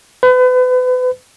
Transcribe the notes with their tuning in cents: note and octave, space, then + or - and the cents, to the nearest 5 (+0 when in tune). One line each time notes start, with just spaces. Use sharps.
B4 +35